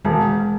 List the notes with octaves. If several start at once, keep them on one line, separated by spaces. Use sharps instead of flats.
E1 G#3